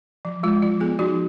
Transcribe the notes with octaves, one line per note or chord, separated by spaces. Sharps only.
F3
G#3 F4
F3 F4
B3 F4 G#4
F3 D#4 F#4